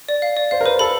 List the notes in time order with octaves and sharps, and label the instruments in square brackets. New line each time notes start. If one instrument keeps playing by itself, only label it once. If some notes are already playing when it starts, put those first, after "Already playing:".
[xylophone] D5
F5
D5
[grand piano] C5 [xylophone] F5
[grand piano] A#4
[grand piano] B4 [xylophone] C5
[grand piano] A4 [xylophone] B5